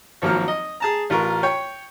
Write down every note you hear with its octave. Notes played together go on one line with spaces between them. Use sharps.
G#1 F3 F#3 A#3 F6
D#5
G#4 A5 A#5
A1 F4 A#4 C#6
C#5 G5